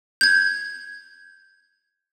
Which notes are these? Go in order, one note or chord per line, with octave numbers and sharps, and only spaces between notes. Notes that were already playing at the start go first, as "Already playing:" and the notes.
G6 G#6